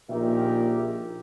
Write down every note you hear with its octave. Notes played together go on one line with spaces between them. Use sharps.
A#1 A#2 D#3 G4 A#4 E5